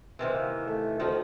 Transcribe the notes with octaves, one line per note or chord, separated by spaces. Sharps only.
C3 D#3 E3
A#3
A3
D2 D#3 F3 D#4